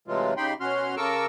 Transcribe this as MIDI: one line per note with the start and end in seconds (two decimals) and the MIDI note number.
0.08 0.34 48
0.08 0.34 52
0.08 0.34 54
0.08 0.34 56
0.08 0.34 57
0.08 0.34 65
0.37 0.54 49
0.37 0.54 63
0.37 0.54 67
0.37 0.54 79
0.37 0.54 83
0.37 0.54 84
0.60 0.95 47
0.60 0.95 61
0.60 0.95 66
0.60 0.95 84
0.60 0.95 89
0.97 1.26 49
0.97 1.26 69
0.97 1.26 70
0.97 1.26 85
0.97 1.26 86
0.97 1.26 88